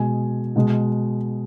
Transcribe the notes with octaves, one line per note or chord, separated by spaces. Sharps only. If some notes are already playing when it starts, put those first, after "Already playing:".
Already playing: B2 G#3 G#5
B2 G#3